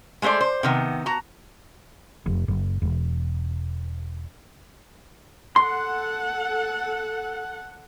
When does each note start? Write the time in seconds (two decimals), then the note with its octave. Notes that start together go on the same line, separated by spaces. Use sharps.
0.22 G#3 A3 B3 C5 D5
0.41 C5
0.63 C3 D#3 B3
1.06 F#4 A#5
2.26 F1
2.48 F#1
2.82 E1
5.56 A4 F#5 C6